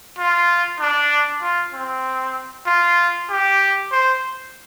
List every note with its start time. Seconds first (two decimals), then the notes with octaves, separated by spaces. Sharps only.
0.19 F4
0.80 D4
1.42 F4
1.74 C4
2.67 F4
3.30 G4
3.92 C5